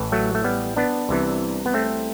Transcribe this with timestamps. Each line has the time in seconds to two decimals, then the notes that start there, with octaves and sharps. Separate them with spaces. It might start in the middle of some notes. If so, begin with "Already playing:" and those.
Already playing: A1 A2 E3
0.12 F#3 A3
0.35 A3
0.44 G3 B3
0.76 B3 D4
1.09 C2 C3 E3
1.66 B3
1.74 A3 C4